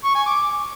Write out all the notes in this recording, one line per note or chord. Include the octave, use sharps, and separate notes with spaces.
C#6
G#5
D6